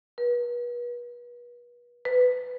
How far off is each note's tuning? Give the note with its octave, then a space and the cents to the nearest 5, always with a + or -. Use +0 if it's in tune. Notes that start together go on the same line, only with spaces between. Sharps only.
B4 -40
B4 +15